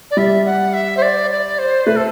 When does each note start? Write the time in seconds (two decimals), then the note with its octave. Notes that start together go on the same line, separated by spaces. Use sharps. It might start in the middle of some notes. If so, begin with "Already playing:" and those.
0.10 D5
0.17 G3 E5
0.45 F#5
0.73 E5
0.96 C5
1.02 D5
1.30 D5
1.58 C5
1.86 A3 B4
1.96 A4